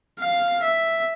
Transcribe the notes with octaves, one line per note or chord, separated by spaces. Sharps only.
F5
E5